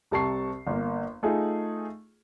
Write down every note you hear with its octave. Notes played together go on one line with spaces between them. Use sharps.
C2 C3 A5 C#6 C7
G1 A#3
A3 D#4 F4 G#4